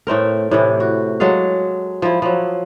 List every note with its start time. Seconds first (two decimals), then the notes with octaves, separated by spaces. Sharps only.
0.07 A2 A3 C4 A#4
0.51 A2 C3 E3
0.80 F#4
1.20 F#3 G#3 A4 F5
2.02 F3 E4
2.22 F3 F#3